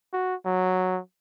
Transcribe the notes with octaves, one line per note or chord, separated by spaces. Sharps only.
F#4
F#3